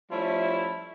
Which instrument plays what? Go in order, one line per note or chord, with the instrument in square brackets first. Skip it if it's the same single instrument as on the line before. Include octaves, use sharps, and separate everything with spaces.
[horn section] F3 G3 A3 C#4 E4